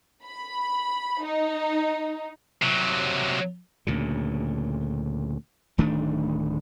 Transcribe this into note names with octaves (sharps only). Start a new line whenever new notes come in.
B5
D#4
C3 F#3
D2 A#2 C#3
D1 D#3 A3 D4